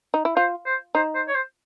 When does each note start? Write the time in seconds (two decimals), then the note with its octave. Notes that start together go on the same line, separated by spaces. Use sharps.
0.14 D#4
0.25 E4
0.36 F4 C5
0.66 C5
0.95 D#4 C5
1.15 C5
1.28 C#5
1.35 C5